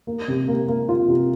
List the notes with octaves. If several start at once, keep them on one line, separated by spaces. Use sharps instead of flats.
A#3
C3
A#3
A#3
F4
C3